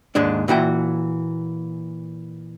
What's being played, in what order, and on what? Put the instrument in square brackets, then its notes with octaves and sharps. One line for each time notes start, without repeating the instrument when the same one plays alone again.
[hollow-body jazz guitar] D#2 G#2 G#3 D4
A#2 E3 F#4 G5